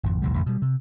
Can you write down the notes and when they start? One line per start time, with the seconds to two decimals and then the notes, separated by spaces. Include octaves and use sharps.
0.03 G#1 F2
0.22 A1 D2 B2 G3
0.34 A1 F2 C#3
0.46 B2 G3
0.62 C3